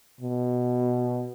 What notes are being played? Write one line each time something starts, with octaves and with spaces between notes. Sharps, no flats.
B2